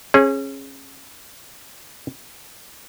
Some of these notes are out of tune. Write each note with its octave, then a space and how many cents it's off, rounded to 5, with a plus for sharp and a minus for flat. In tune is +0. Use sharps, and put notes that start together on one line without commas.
C#4 -30 G#4 +0